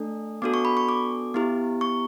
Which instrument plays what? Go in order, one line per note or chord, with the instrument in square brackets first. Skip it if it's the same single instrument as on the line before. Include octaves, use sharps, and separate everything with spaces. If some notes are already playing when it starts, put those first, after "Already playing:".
Already playing: [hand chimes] A3 D4 A4
B3 D4 F#4 A4 D6
C#6
B5
C#6
D6
B3 E4 G4
C#6